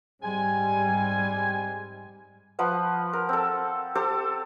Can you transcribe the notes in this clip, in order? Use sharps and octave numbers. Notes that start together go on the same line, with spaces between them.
G#2 G3 G#3 C4 G#5
F3 B4 F#5
A#4
C4 A4
G4 A4 C5